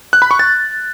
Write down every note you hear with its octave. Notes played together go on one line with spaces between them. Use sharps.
F#6
B5
C#6
A6